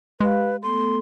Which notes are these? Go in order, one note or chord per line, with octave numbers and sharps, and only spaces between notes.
G#3 G4 B4 F5
A3 B3 A4 C6